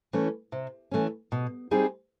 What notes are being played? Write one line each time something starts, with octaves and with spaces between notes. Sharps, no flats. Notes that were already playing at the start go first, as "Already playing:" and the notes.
E3 A3 C#4
C3
E3 A3 C#4
B2
G3 C4 D#4 G#4